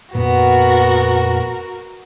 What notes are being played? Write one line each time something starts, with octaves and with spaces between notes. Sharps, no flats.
F2 A#2 B3 F#4 A#4